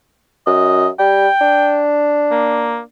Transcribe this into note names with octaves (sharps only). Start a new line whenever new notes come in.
F#2 D#5
G3 G5
D4
A#3